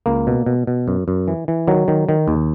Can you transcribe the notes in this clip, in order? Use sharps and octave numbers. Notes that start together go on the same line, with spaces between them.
C#2 A#3
B2
B2
B2
F#2
F#2
E3
E3
D#3 F#3
D#3
D#3
D#2